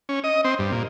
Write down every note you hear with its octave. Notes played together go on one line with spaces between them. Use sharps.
C#4
D#5
C4
G2
A#2